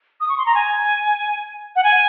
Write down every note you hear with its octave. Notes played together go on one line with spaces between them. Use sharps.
D#6
C#6
C6
A#5
G#5
F#5
G#5